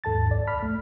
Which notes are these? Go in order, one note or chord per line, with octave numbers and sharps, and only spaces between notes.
D#2 G#2 A4 A5 A6
C2 D5
B5 F6 B6
A3